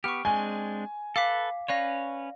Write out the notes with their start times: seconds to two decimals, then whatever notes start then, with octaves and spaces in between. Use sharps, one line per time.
0.04 B3 G4 C#6 F6
0.25 G#3 C4 D4 G#5
1.16 A4 B4 F5 D6 B6
1.68 C#4 B4 C#5 D5 F5 A#6